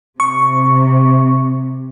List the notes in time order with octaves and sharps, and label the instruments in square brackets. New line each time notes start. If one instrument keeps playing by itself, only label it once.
[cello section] C3 [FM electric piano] C#6